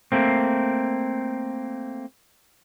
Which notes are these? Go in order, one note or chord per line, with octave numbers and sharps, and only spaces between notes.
A3 A#3 C4